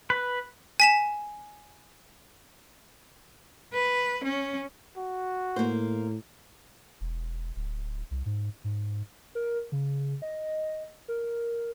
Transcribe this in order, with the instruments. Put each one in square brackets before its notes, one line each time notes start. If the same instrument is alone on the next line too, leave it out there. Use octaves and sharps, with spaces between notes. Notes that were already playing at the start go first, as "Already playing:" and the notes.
[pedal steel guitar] B4
[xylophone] G#5 B6 E7
[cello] B4
C#4
[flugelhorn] F#4
[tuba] A2 [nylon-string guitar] A#3 C5
[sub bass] E1
D1
C2
G#2
G#2
[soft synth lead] A#4
C#3
D#5
A#4